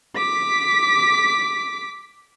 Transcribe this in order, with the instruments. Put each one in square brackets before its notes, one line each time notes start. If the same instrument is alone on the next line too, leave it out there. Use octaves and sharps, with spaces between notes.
[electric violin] D6 B6